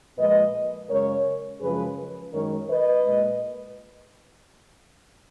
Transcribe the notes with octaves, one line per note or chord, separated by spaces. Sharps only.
A#2 F3 G#3 B4 D#5
F#2 C#3 G#3 A#4 C#5
F#2 C#3 F3 G#3 G#4 B4
F#2 D#3 G#3 A#4 C#5
B4 D#5
A#2 G#3